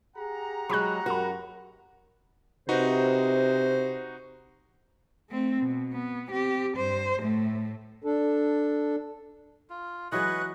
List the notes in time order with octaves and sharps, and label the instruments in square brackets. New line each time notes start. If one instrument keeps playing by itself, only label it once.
[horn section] G4 F#5 A#5 [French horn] G#4
[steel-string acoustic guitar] F#3 G#3 [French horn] G#4 [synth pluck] B5 C#6 F#6
[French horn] F#2 [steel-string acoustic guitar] F#4 [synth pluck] A#4 B5
[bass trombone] C3 [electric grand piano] D#4 F#4 B4 [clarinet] C5
[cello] A3 C4
B2
B3
C4 G4
G2 C5
A2 A3
[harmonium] D4 A4
[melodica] F4
[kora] E3 F#3 G#3 [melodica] B4 D#5 C#6 [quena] F#6